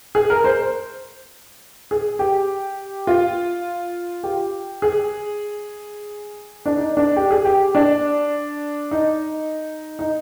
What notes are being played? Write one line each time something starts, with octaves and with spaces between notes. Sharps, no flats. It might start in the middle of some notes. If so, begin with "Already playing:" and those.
G#4
A#4
C5
G#4
G4
F4
G4
G#4
D4
D#4
D4
G4
G#4
G4
D4
D#4
D#4